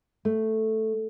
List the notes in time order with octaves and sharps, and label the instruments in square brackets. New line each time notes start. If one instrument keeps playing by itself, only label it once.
[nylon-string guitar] A3